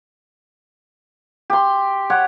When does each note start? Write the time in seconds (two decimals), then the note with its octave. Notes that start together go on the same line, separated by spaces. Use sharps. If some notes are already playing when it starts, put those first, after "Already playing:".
1.50 G4 C6
2.10 G4 C#5 F#5